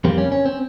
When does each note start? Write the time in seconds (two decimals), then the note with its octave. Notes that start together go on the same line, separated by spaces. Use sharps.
0.04 F2 C#3 G3 A#3 C4
0.18 C#4
0.32 C#4
0.45 C4